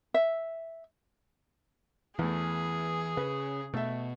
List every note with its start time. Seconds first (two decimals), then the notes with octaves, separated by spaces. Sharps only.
0.14 E5
2.19 E2 E3 A3 G#4
3.17 C#3 B4
3.74 B2 A3 E5